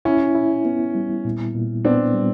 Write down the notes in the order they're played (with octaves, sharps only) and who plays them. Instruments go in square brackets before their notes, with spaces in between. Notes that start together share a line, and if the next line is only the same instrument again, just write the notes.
[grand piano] C#4 [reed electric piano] E4
[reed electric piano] E4
B3
G3
A#2
A#2
[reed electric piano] B3 [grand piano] C4 D4
[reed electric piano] G3